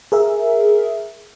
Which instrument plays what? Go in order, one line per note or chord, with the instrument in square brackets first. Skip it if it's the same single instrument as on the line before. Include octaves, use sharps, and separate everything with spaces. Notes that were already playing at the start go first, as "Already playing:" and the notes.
[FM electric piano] G#4 A#4 E5